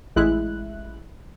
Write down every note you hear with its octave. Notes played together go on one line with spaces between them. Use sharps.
A1 G#3 E4 F#6